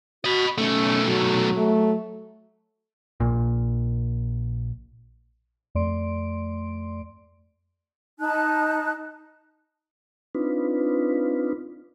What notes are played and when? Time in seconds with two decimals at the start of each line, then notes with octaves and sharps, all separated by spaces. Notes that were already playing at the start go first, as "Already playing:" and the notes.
0.25 F#4 D#5 B5
0.58 B1 A3 C#4
1.05 F#3
1.57 A3
3.20 A#1 A#2
5.75 F2 A3 D5 C6 D7
8.20 D#4 A5 F#6
10.35 C4 D4 D#4 F4 B4